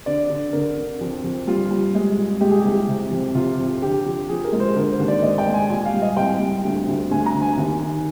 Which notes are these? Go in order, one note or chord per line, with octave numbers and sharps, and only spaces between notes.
D3 D5
D3
D3 A#4
D3
F2
F2
G3 F4
G3
G#3
A#2
G#3 G4
G#4
C2 G4
C3
F2
C3 F4
F2
D3 G4
F3
F3 G#4
A#4
G#3
C5
D3 A#4
C5
D#2
D5
G#3 D#5
G5
G#3
G#5
A#2 G#5
F5
G3
D#5
C2 G5
G3
D2
D2
D2 G#5
A#5
D3
G#5
D#2
D#3